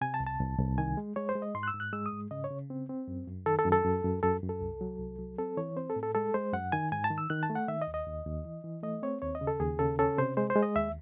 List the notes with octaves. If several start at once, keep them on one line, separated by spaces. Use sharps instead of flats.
C3 G#5
A5
C2
A5
C2
C2
D#3 G#5
G#3
G#3 C#5
C5
G#3
D#5
G#2 C6
F#6
E6
G#2
F#6
G#3 E6
D#6
G#2
C#3 D#5
C#5
C#3
C4
C4
F#2
F#2
D#3 A4
A4
F#2
A4
F#2
F#2
F#2 A4
F#2
A4
C2
F#3
C2
F#3
C4 A4
E3 C#5
C4 C5
A4
A2
A4
G#3 A4
G#3 C5
F#2 F#5
D#3 G#5
G#2 G#5
A5
D#3
E6
D#3 F#6
A5
A3
F#5
D#3 E5
D#5
D#2
D#5
D#2
D#2
E3
E3
A3 D#5
C4 C#5
D#2 C#5
D#5
C#3
A4
D#2 G#4
C#3 A4
C#4 A4
C3 C5
G#3 C5
C5
G#3
D#5
D#2 E5